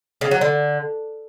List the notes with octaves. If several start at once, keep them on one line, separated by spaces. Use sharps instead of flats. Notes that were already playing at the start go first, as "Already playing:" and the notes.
C#3
F#3
D3